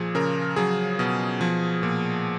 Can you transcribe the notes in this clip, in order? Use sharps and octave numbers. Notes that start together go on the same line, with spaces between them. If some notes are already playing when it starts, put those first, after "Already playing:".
Already playing: A#2 F3 G#4
C#3 A#4
F#3 G#4
B2
F3
A#2